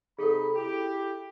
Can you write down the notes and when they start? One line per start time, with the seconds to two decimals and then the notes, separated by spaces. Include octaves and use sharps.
0.19 C3 D#4 G#4 A4 B5
0.56 E4 G4